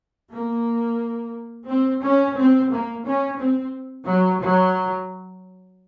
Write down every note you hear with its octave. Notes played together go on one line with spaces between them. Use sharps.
A#3
C4
C#4
C4
A#3
C#4
C4
F#3
F#3